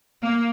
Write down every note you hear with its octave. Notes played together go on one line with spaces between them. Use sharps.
A#3